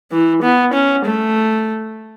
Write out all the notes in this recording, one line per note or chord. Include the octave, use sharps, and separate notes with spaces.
E3
B3
C#4
A3